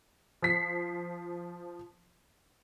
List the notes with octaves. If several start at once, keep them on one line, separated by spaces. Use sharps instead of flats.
F3 B6 C7